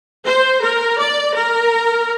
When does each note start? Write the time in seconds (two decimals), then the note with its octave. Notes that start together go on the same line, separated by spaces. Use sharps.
0.25 C5
0.62 A#4
0.99 D5
1.35 A#4